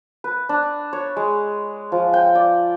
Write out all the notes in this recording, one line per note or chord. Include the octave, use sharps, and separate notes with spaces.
B4
D4
C#5
G#3
F3
G5
D5